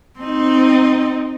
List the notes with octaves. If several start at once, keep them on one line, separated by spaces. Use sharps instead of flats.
C4 D#4